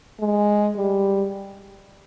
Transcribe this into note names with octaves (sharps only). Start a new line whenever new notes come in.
G#3
G3